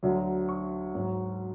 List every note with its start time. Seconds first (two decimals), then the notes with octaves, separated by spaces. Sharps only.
0.03 D2 D3 F#3
0.49 C#6
0.95 G#2 F#3